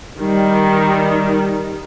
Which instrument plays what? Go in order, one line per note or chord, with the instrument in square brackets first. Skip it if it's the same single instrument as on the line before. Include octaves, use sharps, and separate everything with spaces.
[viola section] D#3 G3